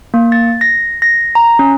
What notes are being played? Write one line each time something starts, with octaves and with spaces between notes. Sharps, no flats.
A#3
A6
A#6
A#6
A#5
C#4